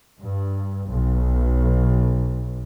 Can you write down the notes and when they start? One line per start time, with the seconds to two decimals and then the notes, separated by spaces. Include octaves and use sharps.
0.22 G2
0.89 B1